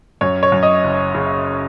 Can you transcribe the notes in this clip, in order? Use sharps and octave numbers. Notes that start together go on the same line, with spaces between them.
F#2 C#5
C#5
F#2
D#5
F#1
C#3